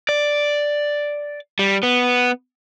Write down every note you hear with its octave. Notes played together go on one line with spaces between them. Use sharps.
D5
G3
B3